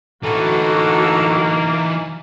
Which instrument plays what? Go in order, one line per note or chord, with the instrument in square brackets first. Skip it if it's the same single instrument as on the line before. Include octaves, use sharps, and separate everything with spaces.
[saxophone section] A2 A4 [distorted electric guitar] E3 D#4 [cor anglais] A#3 [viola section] F#4